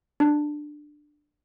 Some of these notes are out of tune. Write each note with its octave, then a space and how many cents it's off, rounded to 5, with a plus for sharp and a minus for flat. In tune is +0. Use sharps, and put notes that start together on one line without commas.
D4 +15